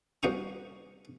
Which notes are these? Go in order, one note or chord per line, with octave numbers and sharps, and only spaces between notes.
C2 A#3 F#4 C5 C#6 D#6